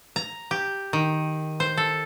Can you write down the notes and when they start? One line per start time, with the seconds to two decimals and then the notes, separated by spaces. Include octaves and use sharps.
0.16 A#5
0.51 G4
0.93 D#3
1.60 C5
1.77 A4